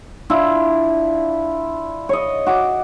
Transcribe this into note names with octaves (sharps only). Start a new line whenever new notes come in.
D4 E4 F4
C#5 D#5
F#4 D6